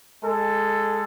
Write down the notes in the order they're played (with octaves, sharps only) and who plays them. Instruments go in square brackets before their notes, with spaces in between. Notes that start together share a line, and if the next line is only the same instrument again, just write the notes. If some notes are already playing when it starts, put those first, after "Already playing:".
[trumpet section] G#3 A4